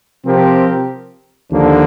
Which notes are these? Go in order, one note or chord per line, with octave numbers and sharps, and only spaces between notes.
C3 F3 C4 G4 A#4
D#2 D3 F3 A#3 D4